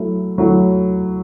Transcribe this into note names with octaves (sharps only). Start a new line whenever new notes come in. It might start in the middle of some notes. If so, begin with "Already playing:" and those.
Already playing: F#3 A3 E4
F#3 A3 E4